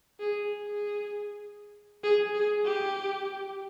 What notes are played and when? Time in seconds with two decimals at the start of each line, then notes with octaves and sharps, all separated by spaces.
0.20 G#4
0.66 G#4
2.04 G#4
2.35 G#4
2.65 G4